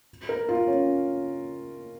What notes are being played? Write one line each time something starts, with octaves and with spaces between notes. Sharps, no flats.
A#4
F4
C#4